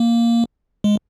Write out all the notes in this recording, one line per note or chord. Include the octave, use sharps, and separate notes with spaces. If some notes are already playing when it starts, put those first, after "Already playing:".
Already playing: A#3
G#3